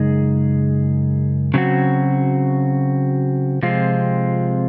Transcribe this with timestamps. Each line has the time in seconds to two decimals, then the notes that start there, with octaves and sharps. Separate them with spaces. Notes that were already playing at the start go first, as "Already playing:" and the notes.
Already playing: F#2 C#3 G#3 D#4 G#4
1.54 C#3 F#3 C4 F#4
3.63 C3 F3 G#3 C4 F4